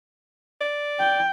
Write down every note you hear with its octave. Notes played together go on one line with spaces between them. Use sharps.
D5
G5